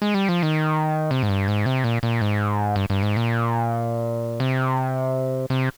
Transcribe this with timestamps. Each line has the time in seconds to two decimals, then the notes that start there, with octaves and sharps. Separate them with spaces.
0.02 G#3
0.14 G3
0.29 F3
0.43 D#3
1.11 C3
1.23 G#2
1.29 G2
1.48 G#2
1.66 C3
1.84 A#2
2.03 A#2
2.21 G#2
2.76 G2
2.90 G2
3.03 G#2
3.17 A#2
4.40 C3
5.50 C3